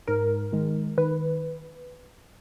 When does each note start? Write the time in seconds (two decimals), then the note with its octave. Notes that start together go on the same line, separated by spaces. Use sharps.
0.07 G#2 A#4
0.52 D#3 G#3
0.98 D#3 B4